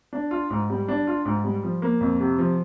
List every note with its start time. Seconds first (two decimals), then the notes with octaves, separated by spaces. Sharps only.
0.13 D4
0.31 F4
0.50 G#2
0.70 G3
0.88 D4
1.07 F4
1.25 G#2
1.44 G3
1.63 F3
1.82 A#3
2.01 F2
2.20 C3
2.38 F3